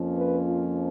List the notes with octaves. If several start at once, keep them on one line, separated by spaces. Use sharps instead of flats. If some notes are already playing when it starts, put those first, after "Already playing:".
Already playing: F2 F3 A#3 C#4
B4
F4